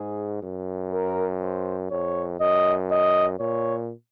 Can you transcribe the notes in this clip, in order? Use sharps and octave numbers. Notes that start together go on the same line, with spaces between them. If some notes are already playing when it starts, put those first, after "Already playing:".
Already playing: G#2 G#4
F#2
A#4
C5
F2 C#5
F#2 D#5
D#5
A#2 C#5